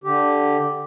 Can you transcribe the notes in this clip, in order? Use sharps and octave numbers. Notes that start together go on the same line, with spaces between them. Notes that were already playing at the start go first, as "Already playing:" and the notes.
D3 G4